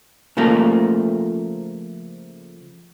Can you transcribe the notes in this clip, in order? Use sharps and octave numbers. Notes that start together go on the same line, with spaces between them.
C#3 F3 A3 A#3